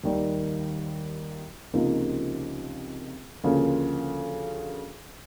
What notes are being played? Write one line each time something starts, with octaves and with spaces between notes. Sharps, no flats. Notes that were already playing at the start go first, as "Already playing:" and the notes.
D#2 D#3 G3
C#2 C3 F3 A#3 D#4
D2 C#3 F3 A#3